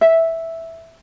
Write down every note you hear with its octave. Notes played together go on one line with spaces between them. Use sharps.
E5